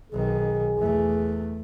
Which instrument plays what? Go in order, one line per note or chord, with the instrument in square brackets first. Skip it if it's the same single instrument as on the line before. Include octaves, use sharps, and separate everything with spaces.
[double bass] B1 D#3 [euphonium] G#4
[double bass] E2 A3